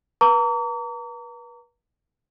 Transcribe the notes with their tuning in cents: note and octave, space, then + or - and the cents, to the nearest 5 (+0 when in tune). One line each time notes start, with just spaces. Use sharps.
B4 -35 A#5 -25 D6 -45